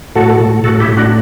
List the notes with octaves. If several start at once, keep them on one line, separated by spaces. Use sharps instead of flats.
A2 F#4 A4
A2
A2 F#4 A4
E4 G4
A2
D4 F#4